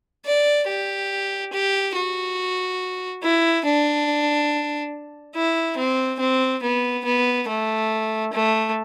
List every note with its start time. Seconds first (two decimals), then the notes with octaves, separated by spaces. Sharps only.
0.26 D5
0.68 G4
1.53 G4
1.96 F#4
3.23 E4
3.65 D4
5.35 E4
5.77 C4
6.20 C4
6.63 B3
7.05 B3
7.48 A3
8.33 A3